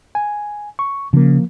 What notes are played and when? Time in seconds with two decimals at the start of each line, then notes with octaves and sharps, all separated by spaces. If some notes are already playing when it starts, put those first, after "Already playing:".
0.15 G#5
0.79 C#6
1.13 C#3 F3 A#3